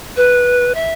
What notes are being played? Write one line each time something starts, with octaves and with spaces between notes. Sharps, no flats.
B4
E5